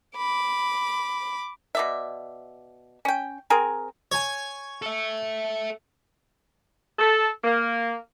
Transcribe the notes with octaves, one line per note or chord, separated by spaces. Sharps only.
B5 D6
B2 D5 E5
C#4 G5
C4 G#4 A#4
C#5 G#5
A4 E5
A4
A#3